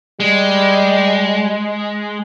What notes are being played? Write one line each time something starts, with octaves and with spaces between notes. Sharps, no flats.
G3 G#3